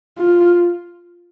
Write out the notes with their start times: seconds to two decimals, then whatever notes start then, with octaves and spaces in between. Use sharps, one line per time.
0.18 F4